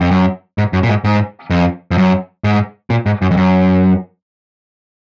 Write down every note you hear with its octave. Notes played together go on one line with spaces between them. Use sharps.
F2
F#2
G#2
F#2
A#2
G#2
G#2
F2
F2
F#2
G#2
A#2
G#2
F#2
F2
F#2